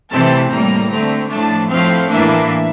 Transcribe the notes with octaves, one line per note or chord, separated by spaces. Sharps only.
C3 E3 A3 C4 A5
A2 G3 A#3 A#5
D3 A3 C4
A2 F3 A3 D4 A5
A2 F3 A3 C4 F5
A2 E3 A#3 D4 E5